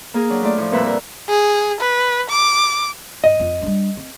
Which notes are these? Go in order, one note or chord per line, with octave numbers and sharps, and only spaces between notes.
A#3 G#4 A#4
F#3 D4
A3 F4 D5
A2 F3
F2 A#2 G3 B4 E5
A#4 B4
G#4
B4
D6
G2 D#5
F2 F3
G3 D4
C4